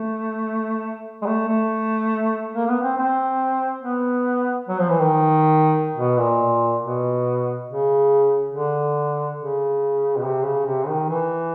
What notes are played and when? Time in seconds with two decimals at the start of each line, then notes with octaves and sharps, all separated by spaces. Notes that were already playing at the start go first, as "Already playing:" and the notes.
Already playing: A3
1.22 G#3
1.26 A3
1.48 A3
2.55 A#3
2.69 B3
2.83 C4
2.97 C4
3.83 B3
4.69 F#3
4.79 F3
4.90 E3
5.00 D#3
5.97 B2
6.18 A#2
6.82 B2
7.67 C#3
8.52 D3
9.39 C#3
10.17 B2
10.24 C3
10.45 C#3
10.66 C3
10.88 D#3
11.10 E3